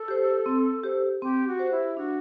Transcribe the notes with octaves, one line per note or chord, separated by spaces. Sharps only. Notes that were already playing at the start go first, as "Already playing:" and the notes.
Already playing: A4
G4 C5
C4
G4 C5
C4 G4
F#4
G4 C5
E4
D4 F#4